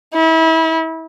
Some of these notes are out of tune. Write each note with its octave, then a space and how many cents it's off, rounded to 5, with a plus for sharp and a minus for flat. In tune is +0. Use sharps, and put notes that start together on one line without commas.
E4 -30